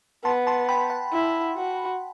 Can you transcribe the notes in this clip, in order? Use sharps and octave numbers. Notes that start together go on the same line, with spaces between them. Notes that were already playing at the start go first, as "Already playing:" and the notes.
B3 A5 C6
A5 C6
G5 B5
F#5 A5
E4
F#4